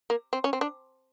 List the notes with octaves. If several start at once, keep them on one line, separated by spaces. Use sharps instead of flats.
A#3
C4
C#4
C4
D4